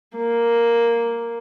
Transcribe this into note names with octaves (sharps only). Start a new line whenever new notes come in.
A#3